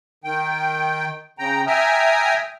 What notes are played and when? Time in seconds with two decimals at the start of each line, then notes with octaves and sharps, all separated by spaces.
0.24 D#3 G5
1.39 C#3 G5 A#5
1.67 E5 G5 G#5 A#5 D#6 F6